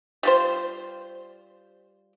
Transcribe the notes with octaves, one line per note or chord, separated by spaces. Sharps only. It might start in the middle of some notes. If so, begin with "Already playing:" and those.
G3 F4 C5